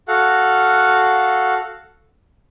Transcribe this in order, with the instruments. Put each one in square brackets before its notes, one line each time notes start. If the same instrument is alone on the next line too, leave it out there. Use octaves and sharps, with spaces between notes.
[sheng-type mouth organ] F#4 A4 F5 F#5